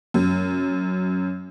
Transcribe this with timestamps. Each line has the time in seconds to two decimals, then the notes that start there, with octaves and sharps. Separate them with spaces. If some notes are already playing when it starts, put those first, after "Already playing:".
0.14 F#2